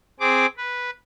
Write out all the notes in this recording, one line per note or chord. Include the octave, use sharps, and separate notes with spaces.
C4 G#4 D6
B4